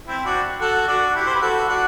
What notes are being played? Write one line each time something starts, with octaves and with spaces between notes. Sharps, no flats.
C4 E4
D4 F#4
F#4 A4
D4 F#4
E4 G4
C5
B4
F#4 A4
D4 F#4